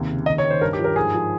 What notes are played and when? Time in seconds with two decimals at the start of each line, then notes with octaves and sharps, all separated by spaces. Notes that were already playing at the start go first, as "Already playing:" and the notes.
Already playing: D#2 C3
0.08 C#3
0.26 D#2 D#5
0.38 C#5
0.45 D#3
0.50 C5
0.61 G2 A#4
0.73 G4
0.79 F3
0.84 A#4
0.96 G#2 G#4
1.15 F3